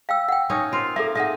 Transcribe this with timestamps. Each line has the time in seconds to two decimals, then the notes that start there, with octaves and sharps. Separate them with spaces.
0.09 F5 G5 E6
0.29 F#5 G5
0.50 C#4 D#4 C#5
0.72 C4 F4 A#4
0.96 A#3 A4 E5
1.15 D#4 G#4 D#5 E5 F#5